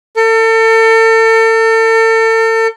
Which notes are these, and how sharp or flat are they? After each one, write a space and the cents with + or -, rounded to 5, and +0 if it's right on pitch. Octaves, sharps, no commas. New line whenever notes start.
A4 +35